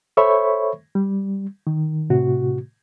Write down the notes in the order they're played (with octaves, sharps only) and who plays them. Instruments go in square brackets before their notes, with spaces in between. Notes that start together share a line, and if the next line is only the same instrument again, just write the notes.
[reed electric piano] A4 C5 C#5 E5 B5 C#6
G3
D#3
A2 C3 F#4